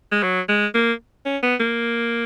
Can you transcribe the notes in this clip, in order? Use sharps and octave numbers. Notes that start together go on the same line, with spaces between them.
G#3
F#3
G#3
A#3
C#4
B3
A#3